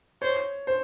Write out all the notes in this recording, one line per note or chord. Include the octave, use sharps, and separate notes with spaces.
C5 C#5
C5